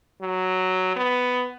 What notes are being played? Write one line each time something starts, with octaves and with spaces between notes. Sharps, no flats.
F#3
B3